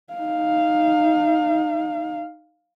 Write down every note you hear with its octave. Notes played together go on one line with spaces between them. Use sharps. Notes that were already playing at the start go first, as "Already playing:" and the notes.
D#4 F5